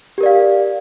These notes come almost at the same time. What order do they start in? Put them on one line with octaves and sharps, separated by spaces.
G4 A#4 D5 F5